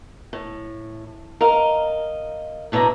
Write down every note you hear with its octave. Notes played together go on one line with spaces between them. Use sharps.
A2
A#4 D#5 F5
F#2 B2 D3 E4 A#5